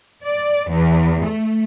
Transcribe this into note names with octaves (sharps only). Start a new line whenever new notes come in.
D5
E2
A3